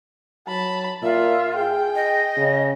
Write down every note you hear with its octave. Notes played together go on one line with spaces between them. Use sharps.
F#3 A5 B5
A#2 F4 E5
G#4 G5
D#5
C#3